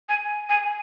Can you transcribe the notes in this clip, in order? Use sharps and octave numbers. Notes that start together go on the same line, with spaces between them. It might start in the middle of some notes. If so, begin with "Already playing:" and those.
G#5
G#5